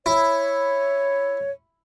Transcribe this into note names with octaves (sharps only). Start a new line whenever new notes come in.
E4 C#5